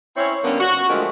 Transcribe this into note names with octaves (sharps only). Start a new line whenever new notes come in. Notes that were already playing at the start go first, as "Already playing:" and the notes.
C4 C#4 E4 C#5
D3 G3 A#3 B3 C#4
F#4
D3 D#3 F3 G#3 A3